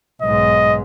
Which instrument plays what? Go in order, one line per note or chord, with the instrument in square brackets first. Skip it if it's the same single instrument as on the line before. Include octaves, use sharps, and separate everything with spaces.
[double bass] B1 G#2 [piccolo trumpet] D#5